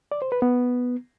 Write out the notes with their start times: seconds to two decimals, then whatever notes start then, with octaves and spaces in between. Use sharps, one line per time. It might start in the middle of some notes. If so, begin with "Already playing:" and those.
0.12 D5
0.22 C5
0.32 B4
0.42 B3